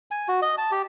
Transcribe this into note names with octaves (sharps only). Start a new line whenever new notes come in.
G#5
F#4
D#5
A5
G4